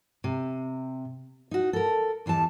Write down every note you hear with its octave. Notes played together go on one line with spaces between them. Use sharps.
C3
D#4 F#4
A4 A#4
E2 E3 G3 A5